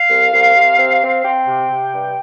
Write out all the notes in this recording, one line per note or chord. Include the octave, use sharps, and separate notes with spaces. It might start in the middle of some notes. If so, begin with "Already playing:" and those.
Already playing: F5
C2
C2
C3
C4
C4
C4 G5
C3
C3
G2